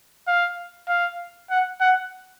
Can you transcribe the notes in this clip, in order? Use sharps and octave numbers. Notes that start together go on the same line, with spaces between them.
F5
F5
F#5
F#5